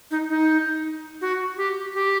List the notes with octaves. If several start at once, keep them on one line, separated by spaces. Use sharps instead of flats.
D#4
D#4
F#4
G4
G4